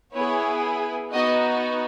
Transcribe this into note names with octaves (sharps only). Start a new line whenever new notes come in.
B3 E4 G#4 C#5
B3 D#4 F#4 D#5